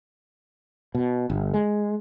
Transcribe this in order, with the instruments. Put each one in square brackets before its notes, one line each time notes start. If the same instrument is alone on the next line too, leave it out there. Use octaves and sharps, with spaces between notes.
[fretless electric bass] B2
G1
G#3